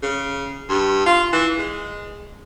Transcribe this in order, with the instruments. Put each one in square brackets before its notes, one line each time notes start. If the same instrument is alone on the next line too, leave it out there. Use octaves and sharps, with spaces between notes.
[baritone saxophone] C#3
G2
F4
E3
G#3